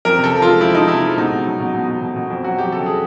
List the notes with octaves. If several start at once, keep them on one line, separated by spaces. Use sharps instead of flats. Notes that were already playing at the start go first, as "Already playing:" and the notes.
F2 A#4
C3
A4
F3
G#3 F4
F3 E4
F3 D#4
C3 E4
G#3
B2 D#4
B2
F#3
B2
B2
B2
B2
B2
F2
F#3 F#4
F2 G4
C#3 A4
G#4